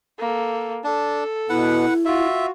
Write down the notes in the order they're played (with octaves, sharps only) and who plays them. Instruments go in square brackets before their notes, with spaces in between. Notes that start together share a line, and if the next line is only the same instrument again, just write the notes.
[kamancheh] A#3 A4
[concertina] D4 [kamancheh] A4
[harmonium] B2 B3 [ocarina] E4 [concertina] B4 F#5
[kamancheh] F4 [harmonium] F#4 [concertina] E5